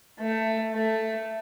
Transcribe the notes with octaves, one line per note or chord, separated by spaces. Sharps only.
A3
A3